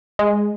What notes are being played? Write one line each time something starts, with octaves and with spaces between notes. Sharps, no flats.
G#3